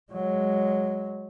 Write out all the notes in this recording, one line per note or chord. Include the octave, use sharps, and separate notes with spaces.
F#3 G#3